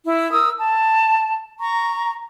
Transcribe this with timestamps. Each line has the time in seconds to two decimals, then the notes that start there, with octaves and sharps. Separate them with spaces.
0.06 E4
0.31 A#4 D#6 E6
0.58 A5
1.59 A#5 C#6